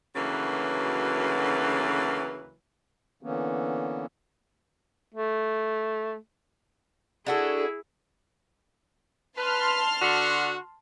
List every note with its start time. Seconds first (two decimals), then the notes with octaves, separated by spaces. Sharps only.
0.15 D2 C#3 E3 F#3 A#3 B4
3.23 D3 E3 A#3 B3 C#4
5.14 A3
7.26 D4 E4 F#4 G#4 A4
9.38 B4 A5 C6 F6
10.02 D3 F#4